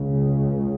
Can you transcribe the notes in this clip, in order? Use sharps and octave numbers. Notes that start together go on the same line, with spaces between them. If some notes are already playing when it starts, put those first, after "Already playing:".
Already playing: C#2 C#3